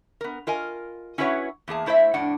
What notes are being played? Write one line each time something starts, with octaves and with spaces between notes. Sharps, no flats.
B3 A#4
F4 A#4 D#5 G#5
C#4 E4 F#4 B4 C#5 F#5
E2 A#3 G#4 A5
A3 E4 C5 D5 E5
F2 A2 D4 F#5